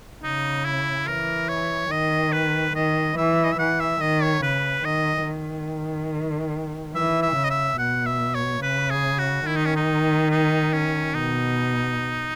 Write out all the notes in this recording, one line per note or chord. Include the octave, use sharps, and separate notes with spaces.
C#3 D#4
E4
E3 A#4
C#5
D#3 D#5
B4
D#3 D#5
E3 E5
D#5
E5
E3 F#5
E5
D#3 D#5
C#5
C#3 B4
D#3 D#5
D#3
E3 E5
E5
C#3
D#5
E5
B2 F#5
E5
C#5
C#3 B4
G#4
F#4
D#3 E4
D#4
C#4
D#4
D#4
C#4
B2 D#4